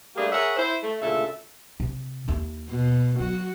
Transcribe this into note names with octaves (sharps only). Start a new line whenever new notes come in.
G3 A3 A#3 D4 G4 G#4
G#4 A#4 C#5 E5 F#5
E4 C5
A3
D2 A#2 C#3 A4 E5
C3
D#2 E4
B2
F#3 F#4